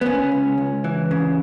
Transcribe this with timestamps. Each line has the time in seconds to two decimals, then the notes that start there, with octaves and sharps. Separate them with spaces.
0.01 B3
0.06 C#3 C#4
0.32 C#2
0.58 C#2
0.84 E3
1.11 C#3